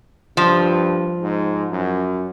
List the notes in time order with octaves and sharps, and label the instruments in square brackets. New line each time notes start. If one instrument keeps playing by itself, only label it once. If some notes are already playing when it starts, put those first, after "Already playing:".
[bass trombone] G2 [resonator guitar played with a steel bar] F3
[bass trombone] G#2
F#2